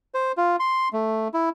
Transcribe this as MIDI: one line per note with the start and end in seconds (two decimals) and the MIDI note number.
0.14 0.32 72
0.37 0.56 65
0.60 0.89 84
0.93 1.28 57
1.34 1.49 64